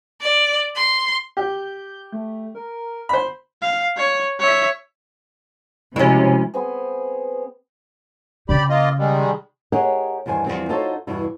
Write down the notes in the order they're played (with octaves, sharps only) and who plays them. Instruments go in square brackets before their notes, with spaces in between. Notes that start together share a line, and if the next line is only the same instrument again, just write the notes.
[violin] D5
C6
[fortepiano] G4 [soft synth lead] G6
[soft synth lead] A3
A#4
[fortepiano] C5 B5
[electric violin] F5
C#5
C#5 E5
[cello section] C3 [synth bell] F3 G#3 F#4 [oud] C#4 E4
[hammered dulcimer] B3 C4 G#4
[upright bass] C#3 [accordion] G4 D5 B5
[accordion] A#3 F4 D#5
D#3 G3 G#3
[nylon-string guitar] G4 G#4 A#4 C#5 D#5 F#5
E2 G2 D#3 C5 G#5
E2 A#2 F3 G3 C4
D#4 F4 F#4 A4 C5 C#5
E2 G2 B2 E3 E4